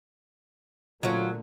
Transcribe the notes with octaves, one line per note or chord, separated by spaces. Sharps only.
A#2 D3 F#3 A3 C#4 F4